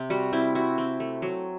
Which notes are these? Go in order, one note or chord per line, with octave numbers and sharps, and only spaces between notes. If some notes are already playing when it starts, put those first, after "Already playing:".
Already playing: C3 C4
G3 F#4
C4 E4
E4 F#4
C4
A3
F#3